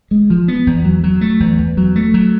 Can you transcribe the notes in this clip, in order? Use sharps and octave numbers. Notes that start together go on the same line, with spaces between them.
G#3
F3
B3
E2
F#3
F#3
A3
E2
E2
F#3
A3
F#3